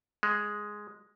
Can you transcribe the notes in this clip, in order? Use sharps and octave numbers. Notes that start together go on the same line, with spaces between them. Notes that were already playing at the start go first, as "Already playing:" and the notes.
G#3